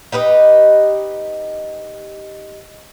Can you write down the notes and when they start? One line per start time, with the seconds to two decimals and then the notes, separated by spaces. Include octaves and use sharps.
0.12 D#4 G4 B4 D#5